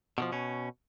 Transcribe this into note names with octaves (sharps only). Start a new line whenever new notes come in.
B2 D3 F3
B2 C#4